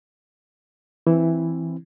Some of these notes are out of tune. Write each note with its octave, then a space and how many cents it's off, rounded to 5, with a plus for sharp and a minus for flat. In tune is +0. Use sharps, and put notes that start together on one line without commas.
E3 +5 C4 +0 E4 +0